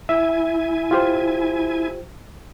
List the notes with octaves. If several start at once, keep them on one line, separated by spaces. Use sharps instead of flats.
E4 E5 G#5
F4 G4 C5